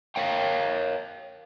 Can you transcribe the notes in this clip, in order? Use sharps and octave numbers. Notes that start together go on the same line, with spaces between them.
A#4 C#5 F5 G5